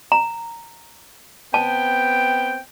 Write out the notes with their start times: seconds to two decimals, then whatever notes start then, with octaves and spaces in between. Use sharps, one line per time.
0.12 A#5
1.54 B3 C4 G5 A5